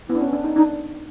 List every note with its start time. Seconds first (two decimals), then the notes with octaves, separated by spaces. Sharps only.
0.09 B3 E4
0.15 D4
0.21 C#4
0.33 D4
0.44 D#4
0.56 D4 D#4